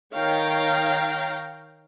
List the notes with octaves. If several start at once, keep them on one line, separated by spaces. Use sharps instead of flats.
D#3 C#5 F5 G5 A#5